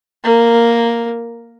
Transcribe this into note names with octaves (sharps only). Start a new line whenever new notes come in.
A#3